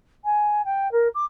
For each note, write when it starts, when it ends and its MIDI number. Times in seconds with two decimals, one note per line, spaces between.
0.25 0.65 80
0.65 0.91 79
0.92 1.08 70
1.15 1.25 86